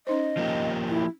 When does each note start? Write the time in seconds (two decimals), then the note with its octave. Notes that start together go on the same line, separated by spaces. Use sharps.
0.07 C#4 D#4 C5 D#5
0.37 F3 A#3 G4
0.88 E4